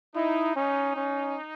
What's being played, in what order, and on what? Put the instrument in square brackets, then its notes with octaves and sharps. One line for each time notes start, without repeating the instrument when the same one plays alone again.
[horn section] D#4 [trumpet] E4
[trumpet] C#4 [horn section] D#4
[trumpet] C#4